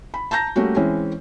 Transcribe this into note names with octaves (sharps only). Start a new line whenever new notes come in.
B5
A5 A#5 G6 A#6
G3 A3 A#3 C#4 F#4
E3 G#3 C4 C#4 E4